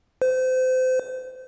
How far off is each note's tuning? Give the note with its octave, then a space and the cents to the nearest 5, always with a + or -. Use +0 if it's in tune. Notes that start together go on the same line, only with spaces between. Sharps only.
C5 -30